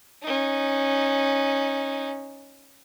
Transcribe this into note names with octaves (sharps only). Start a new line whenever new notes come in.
C#4 D#4